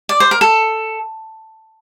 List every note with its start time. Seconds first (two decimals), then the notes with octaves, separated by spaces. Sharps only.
0.09 D5
0.20 C5
0.31 A#4
0.41 A4